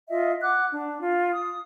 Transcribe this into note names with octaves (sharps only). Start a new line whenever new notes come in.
F4 D#5 E5
F#5 D6 F#6
D4
F4
D#6